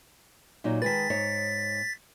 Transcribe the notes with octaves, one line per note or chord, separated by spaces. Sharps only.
A#2 F#3 D#4
D#3 G#3 B4 A6 B6
G#2 D#4 C#5